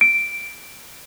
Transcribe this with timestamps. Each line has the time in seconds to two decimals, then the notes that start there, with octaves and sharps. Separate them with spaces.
0.01 D7